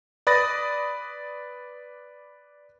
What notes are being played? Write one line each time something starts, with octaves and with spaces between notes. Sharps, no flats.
B4 D5 B5 D#6 A6 A#6